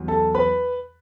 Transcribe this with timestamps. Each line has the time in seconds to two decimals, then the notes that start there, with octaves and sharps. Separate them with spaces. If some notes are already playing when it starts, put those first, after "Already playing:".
Already playing: E2 F#3
0.08 A4 A5
0.35 B4 B5